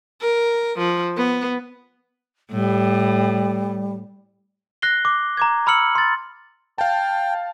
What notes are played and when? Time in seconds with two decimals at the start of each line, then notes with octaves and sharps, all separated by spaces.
0.21 A#4
0.79 F3
1.17 B3
2.51 A2 G3
4.82 F#6 A#6 C7 G7
5.05 D6
5.37 A#5 D6 G#6
5.66 A#5 B5 E6 F6 C#7 F#7
5.95 C6 A6
6.78 F5 G5 A5